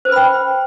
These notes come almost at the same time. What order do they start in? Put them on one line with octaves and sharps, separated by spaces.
C5 B4 B5 G5